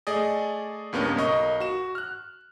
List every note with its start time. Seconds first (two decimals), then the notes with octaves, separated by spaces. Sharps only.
0.07 A3 G#4 D5 D#5
0.93 C#2 G2 A#3 B3 C#4
1.16 B1 A#4 D#5 C#6
1.60 F#4 E7
1.95 F6 F#6